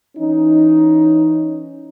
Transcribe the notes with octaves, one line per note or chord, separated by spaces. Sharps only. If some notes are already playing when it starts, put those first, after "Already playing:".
E3 C#4 D#4